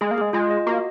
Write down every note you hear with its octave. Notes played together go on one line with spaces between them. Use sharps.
G#3 G#4
A#3
G#3 G#4
G#3 F4
D#5
A#3 F#4